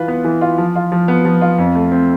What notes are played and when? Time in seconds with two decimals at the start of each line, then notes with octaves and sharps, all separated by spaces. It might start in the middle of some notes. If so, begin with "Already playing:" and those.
Already playing: E3 F4 B4
0.08 B3
0.25 E3
0.41 F4
0.58 F3
0.75 F4
0.92 F3
1.08 B3
1.25 F3
1.41 F4
1.58 F2
1.75 A3
1.92 C4